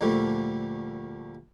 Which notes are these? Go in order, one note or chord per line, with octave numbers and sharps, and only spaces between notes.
D2 A#2 F3 G3 A3